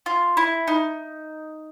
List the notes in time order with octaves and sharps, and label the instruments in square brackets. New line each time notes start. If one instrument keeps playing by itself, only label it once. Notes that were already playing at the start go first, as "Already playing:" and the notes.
[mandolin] F4
E4
D#4